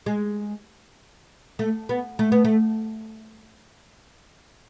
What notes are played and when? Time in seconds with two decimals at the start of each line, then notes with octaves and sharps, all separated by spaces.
0.06 G#3
1.59 A3
1.89 B3
2.19 A3
2.32 B3
2.45 A3